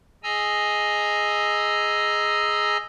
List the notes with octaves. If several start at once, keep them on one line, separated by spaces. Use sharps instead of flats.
G#4 D#5 G#5 A#5 E6